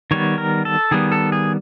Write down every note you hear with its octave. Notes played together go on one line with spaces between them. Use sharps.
D#3 G3 B3 C#5
A#4
A4
D#3 G3 B3 G#4
A4
G#4